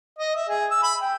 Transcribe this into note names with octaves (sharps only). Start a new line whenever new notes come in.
D#5
E5
G#4
E6
B5
G5